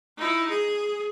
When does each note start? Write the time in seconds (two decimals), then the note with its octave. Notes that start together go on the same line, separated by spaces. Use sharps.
0.17 D#4 E4
0.50 G#4